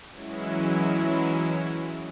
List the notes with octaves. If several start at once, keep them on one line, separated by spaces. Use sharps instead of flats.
E3 F#3 G#3 C#4 E4